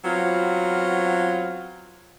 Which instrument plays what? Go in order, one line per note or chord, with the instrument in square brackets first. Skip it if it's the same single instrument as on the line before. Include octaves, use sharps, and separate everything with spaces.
[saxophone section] F#3 B3 C4 F4